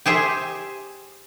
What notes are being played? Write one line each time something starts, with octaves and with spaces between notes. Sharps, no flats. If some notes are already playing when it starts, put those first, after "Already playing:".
G4 G#4 C5 E5